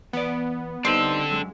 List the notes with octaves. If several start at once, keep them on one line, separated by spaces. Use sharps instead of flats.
E2 B3 D5
G3 C4 D4 D#4 A4
F#2 G#3